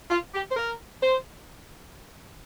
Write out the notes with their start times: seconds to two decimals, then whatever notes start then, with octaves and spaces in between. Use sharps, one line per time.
0.10 F4
0.34 G4
0.50 C5
0.56 A#4
1.01 C5